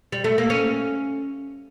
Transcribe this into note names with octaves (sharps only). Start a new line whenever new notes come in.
G3
A3
A#3
C#4